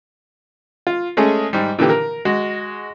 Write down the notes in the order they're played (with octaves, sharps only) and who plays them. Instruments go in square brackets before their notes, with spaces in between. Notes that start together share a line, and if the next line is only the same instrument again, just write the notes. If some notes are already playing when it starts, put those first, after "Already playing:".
[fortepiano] F4
G#3 A3 C#4 G#4
G#2 G3
A#2 D3 E3 G4
A#4
G#3 F#4